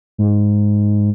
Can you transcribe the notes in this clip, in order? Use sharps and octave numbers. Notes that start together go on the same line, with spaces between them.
G#2